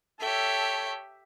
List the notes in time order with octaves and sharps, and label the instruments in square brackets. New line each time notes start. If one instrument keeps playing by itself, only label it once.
[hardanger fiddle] G4 E5 [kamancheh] A4 C#5